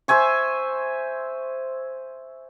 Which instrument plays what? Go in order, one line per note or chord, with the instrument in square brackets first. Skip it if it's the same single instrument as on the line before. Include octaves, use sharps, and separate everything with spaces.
[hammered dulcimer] C5 E5 G#5 C#6